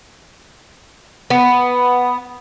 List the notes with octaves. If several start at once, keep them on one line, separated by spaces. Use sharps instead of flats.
B3